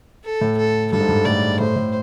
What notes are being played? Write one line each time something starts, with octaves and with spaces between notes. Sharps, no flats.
A4
A2
A4
G2 A4
G#2
G2
A2 D5
A2 C5
A2